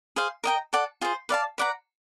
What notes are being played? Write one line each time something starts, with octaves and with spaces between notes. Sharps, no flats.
G#4 C5 F5
A#4 D#5 G5 A#5
A4 D5 F#5 A5
F4 G#4 C5
B4 D5 F5 A5
B4 D5 F#5 A#5